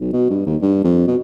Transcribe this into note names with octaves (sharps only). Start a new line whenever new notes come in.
B1
B2
G2
D#2
G2
F2
B2